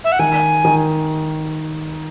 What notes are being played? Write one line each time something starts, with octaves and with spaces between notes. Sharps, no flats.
E5
F#5
D#3 G#5
D#3